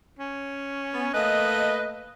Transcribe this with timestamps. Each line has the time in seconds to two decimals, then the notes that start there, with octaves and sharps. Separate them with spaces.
0.19 C#4
0.93 B3
1.14 A3 A#3 B4 D#5